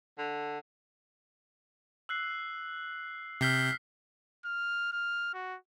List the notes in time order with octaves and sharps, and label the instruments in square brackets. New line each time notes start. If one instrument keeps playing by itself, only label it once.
[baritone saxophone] D3
[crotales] E6 F#6 C7
[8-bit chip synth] C3 G6 [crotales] F6 B6 C7
[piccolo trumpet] F6
F6
F#4